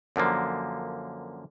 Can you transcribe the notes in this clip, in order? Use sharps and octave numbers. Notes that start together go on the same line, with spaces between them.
F#2 D3 F3 A#3